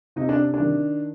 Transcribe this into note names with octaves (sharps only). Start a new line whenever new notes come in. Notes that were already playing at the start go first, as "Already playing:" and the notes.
C3 D#4
D4
D4
D#3